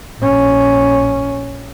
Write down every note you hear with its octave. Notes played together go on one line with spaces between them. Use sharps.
A#1 C#4